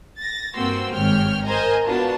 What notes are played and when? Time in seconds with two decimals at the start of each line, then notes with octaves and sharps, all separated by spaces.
0.18 A6 A#6
0.55 G2 A#3 C4 F#4 C6 E6
0.93 G#1 G2 C#5 G5 F6
1.44 A#4 C5 D#5 G#5 A#5
1.86 B3 D4 F4 F#4 A5